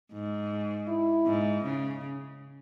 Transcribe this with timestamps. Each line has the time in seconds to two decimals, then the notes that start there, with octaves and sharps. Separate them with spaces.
0.12 G#2
0.87 E4
1.26 G#2
1.64 C#3